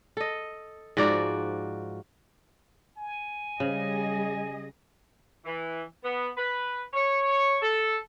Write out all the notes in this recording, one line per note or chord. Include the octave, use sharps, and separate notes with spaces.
A4 D#5
G#2 F3 F#4 D5
G#5
C#3 G3 G#4 D#5
E3
B3
B4
C#5
A4